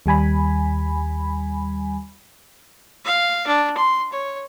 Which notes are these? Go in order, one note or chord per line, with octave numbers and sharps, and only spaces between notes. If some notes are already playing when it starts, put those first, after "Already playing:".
D#2 G3 G#5 B5
F5
D4
C6
C#5